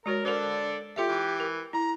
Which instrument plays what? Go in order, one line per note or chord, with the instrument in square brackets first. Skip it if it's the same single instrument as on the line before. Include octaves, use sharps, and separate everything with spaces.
[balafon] G#3 F#4 C#5 [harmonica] A#4 A#5
[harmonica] D4 A4 D5 [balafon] A#4 C5
[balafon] F4 A4 E5 [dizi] G4
[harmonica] E3
[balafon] A#4
[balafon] E4 [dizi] A#5